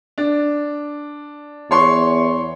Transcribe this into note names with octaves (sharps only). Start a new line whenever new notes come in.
D4
E2 C#5 C6 C#6